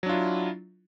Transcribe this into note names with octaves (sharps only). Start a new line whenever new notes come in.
F#3 D4 E4 F4